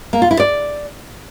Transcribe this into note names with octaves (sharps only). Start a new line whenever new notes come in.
A#3
F4
E4
D5